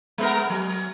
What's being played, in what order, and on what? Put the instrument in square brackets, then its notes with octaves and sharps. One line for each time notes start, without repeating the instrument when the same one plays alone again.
[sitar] G#3 B3 A#4
F#3